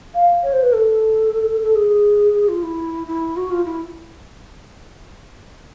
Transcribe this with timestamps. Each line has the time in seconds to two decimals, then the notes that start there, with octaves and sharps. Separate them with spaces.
0.14 F5
0.43 C#5
0.53 C5
0.63 B4
0.73 A4
1.61 A4
1.75 G#4
2.48 F4
2.62 E4
3.07 E4
3.36 F#4
3.51 F4
3.65 E4